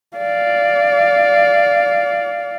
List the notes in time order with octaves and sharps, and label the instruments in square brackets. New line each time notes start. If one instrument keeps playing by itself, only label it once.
[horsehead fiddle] D5 F5